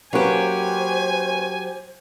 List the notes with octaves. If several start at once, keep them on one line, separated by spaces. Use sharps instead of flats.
F#3 A#3 C#4 G4 B4 C5 G#5